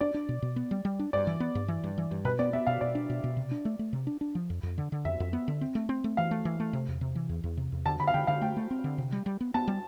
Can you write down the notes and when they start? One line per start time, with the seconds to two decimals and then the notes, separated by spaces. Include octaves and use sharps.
0.01 D4 D5
0.14 D4
0.29 B2
0.42 B2
0.56 B3
0.71 G3
0.85 G3
0.99 D4
1.13 G2 D5
1.27 E3
1.40 B3
1.55 G2
1.68 E3
1.84 G2
1.98 E3
2.11 G2
2.25 B2 B4
2.39 B3 D5
2.53 B3 E5
2.67 B2 F5
2.81 B2 D5
2.95 D4
3.10 B2
3.24 B2
3.37 C3
3.51 D4
3.65 A3
3.79 A3
3.93 C3
4.07 D4
4.21 D4
4.35 F3
4.50 F2
4.63 F2
4.78 D3
4.92 D3
5.05 F2 E5
5.20 F2
5.33 B3
5.48 D3
5.61 C4
5.75 A3
5.89 C4
6.04 A3
6.17 E3 F5
6.31 A3
6.45 E3
6.60 A3
6.73 C3
6.88 E2
7.01 C3
7.15 E3
7.29 E2
7.44 E2
7.57 C3
7.72 E2
7.86 D3 A5
8.00 D3 B5
8.07 F5
8.14 D3 G5
8.27 D3 F5
8.41 A3 G5
8.57 A3
8.71 C4
8.84 D3
8.98 C3
9.12 G3
9.26 G3
9.41 B3
9.54 B3 A5
9.68 G3